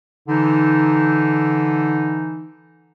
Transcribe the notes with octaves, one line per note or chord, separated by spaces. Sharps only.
D3 E3 D#4